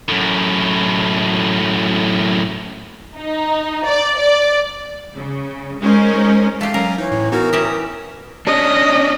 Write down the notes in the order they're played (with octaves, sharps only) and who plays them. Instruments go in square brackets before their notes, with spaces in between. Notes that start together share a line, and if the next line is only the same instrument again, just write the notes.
[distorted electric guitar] F#2 A2
[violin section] D#4
D5
D5
[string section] C#3
G#3 C#4 D#4 A#4 C5
[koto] A3 G4 [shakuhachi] F5
[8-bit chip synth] F#3 C#4 [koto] A#4
[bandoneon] E3 [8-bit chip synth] D#4 [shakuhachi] C#5
[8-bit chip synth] A2
[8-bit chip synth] B3 D#4 F#4 [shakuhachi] A#4
[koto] C#4 E4 G4 [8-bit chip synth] D#6
[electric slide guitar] C#4 D4 [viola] D#5